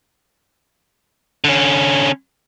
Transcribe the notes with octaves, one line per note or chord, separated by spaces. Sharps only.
D3 C#4